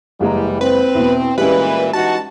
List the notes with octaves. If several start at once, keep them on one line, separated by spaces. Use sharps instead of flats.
F#1 E3 G3 G#3 A#5
C4 B4
E2 B2
A#2 E3 G3 G#3 C#4 B4
E3 D#4 F#4 A5